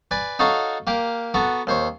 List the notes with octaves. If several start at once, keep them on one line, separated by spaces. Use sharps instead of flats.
B4 D5 G#5
D#4 F#4 A4 C#5 F5 A#5
A#3 G4 A#4
B3 F#4 A4 A#5
D#2 C5 C#5